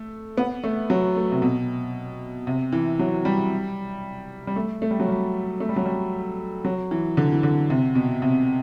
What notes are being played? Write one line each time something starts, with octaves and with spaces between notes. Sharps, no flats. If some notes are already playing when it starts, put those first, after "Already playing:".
Already playing: A3
B3
A3
F#3
A3
C3
B2
C3
E3
F#3
G3
G3
A3
A3
G3
F#3
G3
A3
G3
F#3
G3
F#3
E3
D3
E3
D3
C3
B2
C3